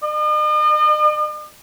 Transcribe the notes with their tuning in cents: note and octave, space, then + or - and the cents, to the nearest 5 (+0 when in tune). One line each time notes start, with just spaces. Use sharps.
D#5 -45